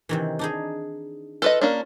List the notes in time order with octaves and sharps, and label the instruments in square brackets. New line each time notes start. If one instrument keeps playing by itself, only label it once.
[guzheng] C3 D#3 E3
D4 D#4 G#4
[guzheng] F4 [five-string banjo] A4 B4 D#5
[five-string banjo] A#3 C#4 D4